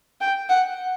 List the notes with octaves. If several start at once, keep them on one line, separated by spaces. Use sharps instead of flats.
G5
F#5